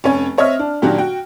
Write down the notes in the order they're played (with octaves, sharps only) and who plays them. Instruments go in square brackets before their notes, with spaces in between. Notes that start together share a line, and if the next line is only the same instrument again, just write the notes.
[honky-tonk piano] F1 C#4 C#5 G#5
C4 C#5 D#5 E5 F6
D4
A#2 D#3 F#3 D4 F#4 G4
F#4 G5